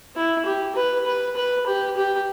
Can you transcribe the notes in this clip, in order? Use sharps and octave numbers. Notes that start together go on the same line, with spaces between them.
E4
G4
B4
B4
B4
G4
G4